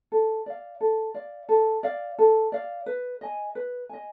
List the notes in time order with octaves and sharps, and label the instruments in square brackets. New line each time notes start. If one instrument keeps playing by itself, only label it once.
[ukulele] A4
D5 F5
A4
D5 F5
A4
D5 F5
A4
D5 F5
B4
D#5 G#5
B4
D#5 G#5